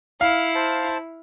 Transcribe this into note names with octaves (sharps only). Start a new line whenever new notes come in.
E4 F5
C5 A5